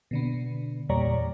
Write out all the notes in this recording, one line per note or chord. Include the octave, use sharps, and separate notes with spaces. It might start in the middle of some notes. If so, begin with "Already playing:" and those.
B2 D3 B3
E2 A#2 G3 C#5 D5 A#5